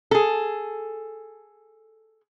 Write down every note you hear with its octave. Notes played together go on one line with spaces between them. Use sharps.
G#4 A4